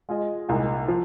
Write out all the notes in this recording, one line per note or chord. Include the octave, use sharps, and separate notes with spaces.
G#3 F4 G#4 D#5
C2 A#2 G#3 D#4
F3